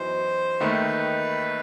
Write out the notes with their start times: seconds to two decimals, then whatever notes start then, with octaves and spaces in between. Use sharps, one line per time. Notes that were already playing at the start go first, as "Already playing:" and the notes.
Already playing: F#2 E3 B3 D#4 F#4 C5
0.60 D#2 D#3 A3 D#4 B4